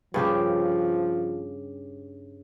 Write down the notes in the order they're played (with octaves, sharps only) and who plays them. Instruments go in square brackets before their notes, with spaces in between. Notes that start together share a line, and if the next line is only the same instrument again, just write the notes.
[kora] G2 C#3 G4 [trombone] F3